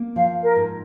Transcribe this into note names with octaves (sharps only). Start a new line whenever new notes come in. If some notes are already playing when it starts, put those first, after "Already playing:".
Already playing: A#3
F3 F5
A#4
G#2